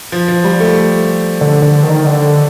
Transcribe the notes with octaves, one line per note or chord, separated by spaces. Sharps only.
F3
F3
G3
A3
D3
D3
D#3
D3